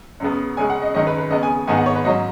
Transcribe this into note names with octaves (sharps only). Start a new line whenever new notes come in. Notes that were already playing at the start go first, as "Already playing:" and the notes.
F#2 C#3 B3
F#2 C#3 G#3 G#5
F#5
D#5
F#2 D#3 G#3 C#4 D#5
B4
B4
C#3 B3 D#5
G#5
G#2 D#3 G#3 B3 G#5
F#5
C#5
B4
G#2 F#3 C#4 D#5